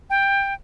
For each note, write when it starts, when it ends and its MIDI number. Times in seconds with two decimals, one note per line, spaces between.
0.10 0.54 79